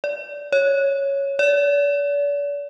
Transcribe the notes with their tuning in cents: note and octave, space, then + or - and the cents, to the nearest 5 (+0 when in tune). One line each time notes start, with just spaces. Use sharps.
D5 -15
C#5 +0
D5 -40